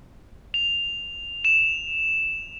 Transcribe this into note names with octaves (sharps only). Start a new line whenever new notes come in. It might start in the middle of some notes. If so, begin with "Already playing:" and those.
F7
E7